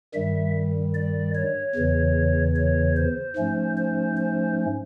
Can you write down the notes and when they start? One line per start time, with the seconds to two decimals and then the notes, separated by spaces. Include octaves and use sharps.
0.14 G2 D#3 G3 E5
0.94 D5
1.35 C#5
1.75 E2 C#3 E3
2.56 C#5
2.96 C5
3.36 G#2 F3 A3 C#4
3.77 C5
4.17 C5